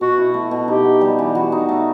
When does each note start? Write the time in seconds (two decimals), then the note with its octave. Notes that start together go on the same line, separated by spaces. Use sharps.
0.01 B2 F#4
0.18 E4
0.34 A3
0.51 B2
0.68 D#4 G4
0.85 B3
1.01 G3
1.19 E3
1.35 F#4
1.52 D#4
1.69 A3